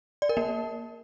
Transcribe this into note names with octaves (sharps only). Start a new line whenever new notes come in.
D5
A#4
A#3